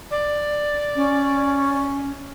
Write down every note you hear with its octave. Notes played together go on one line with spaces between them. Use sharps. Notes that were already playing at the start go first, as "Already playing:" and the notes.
D5
C#4